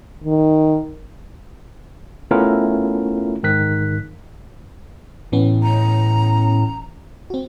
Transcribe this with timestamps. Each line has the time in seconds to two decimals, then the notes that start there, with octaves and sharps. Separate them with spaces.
0.24 D#3
2.31 A3 B3 C#4 E4 F4 A#4
3.43 G#2 D#3 F#6 B6
5.32 A2 E3 B3 C#4
5.63 A#5
7.30 C4 F#4